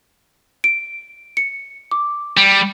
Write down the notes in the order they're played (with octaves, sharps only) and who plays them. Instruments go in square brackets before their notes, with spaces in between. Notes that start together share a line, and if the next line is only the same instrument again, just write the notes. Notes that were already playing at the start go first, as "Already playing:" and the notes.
[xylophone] D7
C#7
D6
[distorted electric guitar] G3